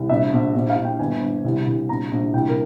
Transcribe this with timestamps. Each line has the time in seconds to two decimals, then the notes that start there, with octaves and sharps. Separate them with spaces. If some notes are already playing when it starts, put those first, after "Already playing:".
Already playing: C2
0.09 A#1 E5
0.32 A#1
0.55 A#1
0.70 F5
0.76 A#1
0.85 G5
0.99 G1 G#5
1.21 G1
1.44 C2
1.67 C2
1.89 A#1 A#5
2.11 A#1
2.33 C2 G5
2.49 A#4